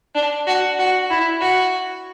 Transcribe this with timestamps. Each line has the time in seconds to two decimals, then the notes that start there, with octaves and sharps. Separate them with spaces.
0.15 D4
0.47 F#4
0.79 F#4
1.10 E4
1.41 F#4